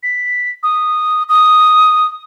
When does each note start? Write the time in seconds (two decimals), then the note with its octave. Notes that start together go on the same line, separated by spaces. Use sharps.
0.03 B6
0.63 D#6
1.29 D#6